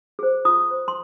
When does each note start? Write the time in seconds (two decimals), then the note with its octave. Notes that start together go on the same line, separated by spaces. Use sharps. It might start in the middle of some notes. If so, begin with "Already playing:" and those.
0.19 G#4 C5
0.45 F4 D#6
0.70 C5
0.88 C6